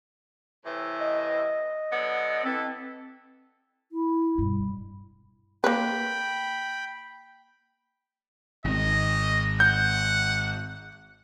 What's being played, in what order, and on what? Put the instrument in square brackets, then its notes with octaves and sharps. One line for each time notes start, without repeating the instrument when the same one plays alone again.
[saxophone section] A2 C3 E3
[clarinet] D#5
[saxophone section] D3 F#3 B3
[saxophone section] E3 A4 [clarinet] C4
[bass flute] E4
[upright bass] G2 B2
[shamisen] A#3 B4 [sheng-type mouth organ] G5 B5
[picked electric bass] G#1 [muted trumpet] D#5
[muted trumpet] F#5 [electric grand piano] G6